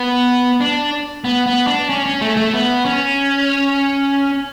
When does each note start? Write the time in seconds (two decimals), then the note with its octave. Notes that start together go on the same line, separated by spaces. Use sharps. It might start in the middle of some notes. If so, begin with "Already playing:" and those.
Already playing: B3
0.61 D4
1.24 B3
1.46 B3
1.67 D4
1.90 C#4
2.06 C#4
2.22 A3
2.37 A3
2.54 B3
2.85 C#4